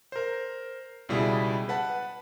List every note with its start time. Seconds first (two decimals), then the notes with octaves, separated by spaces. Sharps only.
0.12 A#4 C5
1.09 C#2 B2 G3 E4 G#4
1.69 B4 F#5 A5